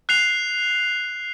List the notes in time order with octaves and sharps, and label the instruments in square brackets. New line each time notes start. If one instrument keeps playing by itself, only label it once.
[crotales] F#6 C7 F7